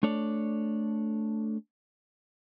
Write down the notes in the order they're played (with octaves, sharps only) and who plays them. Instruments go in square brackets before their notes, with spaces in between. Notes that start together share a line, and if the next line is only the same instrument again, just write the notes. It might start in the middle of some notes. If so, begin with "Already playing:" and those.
[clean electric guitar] A3 D4 A4 C#5 D5